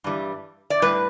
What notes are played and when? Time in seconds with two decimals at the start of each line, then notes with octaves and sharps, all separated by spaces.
0.04 G2 E3 G3
0.70 D5
0.82 A2 G3 B4